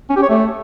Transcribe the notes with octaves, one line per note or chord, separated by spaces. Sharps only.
C#4
G4
C#5
A3